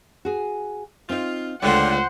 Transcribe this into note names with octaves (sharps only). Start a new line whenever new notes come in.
F#4 G#4
C4 D#4 F4
C#2 D3 A3 F4 C5 F#5 G5